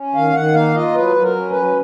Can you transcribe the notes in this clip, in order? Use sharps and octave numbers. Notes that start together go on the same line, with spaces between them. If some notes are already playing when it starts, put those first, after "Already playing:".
Already playing: C#4
D#3 F5
D#3 F#5
A#3 F5
F4 D#5
F#3 B4
F#3
A#4
C#4
B4
F#3